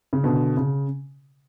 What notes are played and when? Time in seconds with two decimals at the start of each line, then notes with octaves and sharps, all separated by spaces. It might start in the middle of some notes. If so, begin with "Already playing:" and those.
0.13 C#3
0.23 B2 D3
0.57 C#3